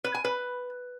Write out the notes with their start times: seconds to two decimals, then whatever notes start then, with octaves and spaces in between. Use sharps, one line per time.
0.04 B4
0.14 G#5
0.25 B4